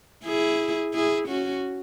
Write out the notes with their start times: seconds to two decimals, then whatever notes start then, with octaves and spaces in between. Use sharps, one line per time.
0.25 E4 G#4
0.94 E4 G#4
1.28 C#4 F#4